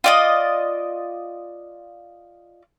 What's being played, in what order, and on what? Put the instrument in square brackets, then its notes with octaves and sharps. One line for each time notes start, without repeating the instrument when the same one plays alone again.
[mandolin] F4 D5 D#5